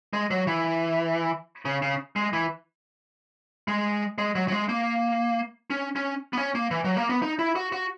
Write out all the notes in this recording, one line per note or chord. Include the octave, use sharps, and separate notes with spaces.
G#3
F#3
E3
C#3
C#3
G#3
E3
G#3
G#3
F#3
F#3
G#3
A#3
C#4
C#4
B3
C#4
A#3
E3
F#3
A#3
B3
D#4
E4
F#4
F#4